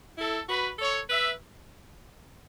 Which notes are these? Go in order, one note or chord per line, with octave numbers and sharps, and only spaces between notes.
E4 A4
F#4 B4
A4 C#5
B4 E5